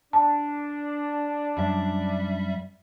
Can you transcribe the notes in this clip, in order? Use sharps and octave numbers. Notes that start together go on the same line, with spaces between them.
D4 A5
F#2 G3 E5